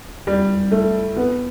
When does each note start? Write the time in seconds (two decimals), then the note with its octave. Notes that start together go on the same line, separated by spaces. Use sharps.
0.27 G3
0.72 A3
1.16 B3